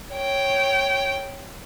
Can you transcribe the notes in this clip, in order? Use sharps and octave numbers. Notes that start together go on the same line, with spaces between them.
C#5 G5